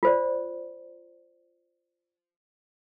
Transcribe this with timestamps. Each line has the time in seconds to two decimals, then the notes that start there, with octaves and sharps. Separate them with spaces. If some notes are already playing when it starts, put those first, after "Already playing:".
0.03 F4 C5 D5